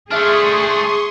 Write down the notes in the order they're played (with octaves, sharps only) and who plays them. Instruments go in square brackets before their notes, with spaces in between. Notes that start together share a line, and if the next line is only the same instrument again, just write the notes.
[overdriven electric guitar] A3 D4 [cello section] G#4 [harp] E5 F6 [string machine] C6 C#6 D#6